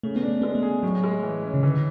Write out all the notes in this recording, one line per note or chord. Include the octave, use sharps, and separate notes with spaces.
C#3 A3
B3
D4
A3
G#3 B3
A3
G#4
A2 F#3
G#3
E3
C#4
C#3
D3 E3